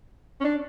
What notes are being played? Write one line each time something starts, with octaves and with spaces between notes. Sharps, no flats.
C#4
D4